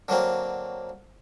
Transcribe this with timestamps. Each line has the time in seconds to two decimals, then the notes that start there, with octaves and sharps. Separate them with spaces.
0.08 D3 F#3 A#3 C4